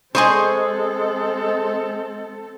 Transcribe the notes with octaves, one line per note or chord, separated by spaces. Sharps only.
G#3 C4 G#4 A4 C5 D#5 C#6